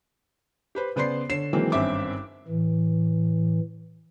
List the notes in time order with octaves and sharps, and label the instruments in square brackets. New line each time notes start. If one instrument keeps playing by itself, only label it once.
[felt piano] G4 B4 C5
C#3 B3 C5 D5 C6 C7
D3 C#5 C7 E7
D#3 E3 F#3 G#3 A#3 C4
G#1 G2 C4 C#4 E5 D6
[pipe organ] A2 E3